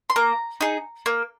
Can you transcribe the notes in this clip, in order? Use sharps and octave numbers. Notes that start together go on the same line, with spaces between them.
C6
A#3 A#5
D#4 G#4
A#3